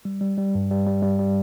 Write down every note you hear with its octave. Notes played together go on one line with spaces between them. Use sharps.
G3
G3
G3
G2
G3
G3
G3
G3